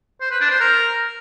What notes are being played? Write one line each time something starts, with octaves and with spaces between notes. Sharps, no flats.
C5
B4
D4
C5
A#4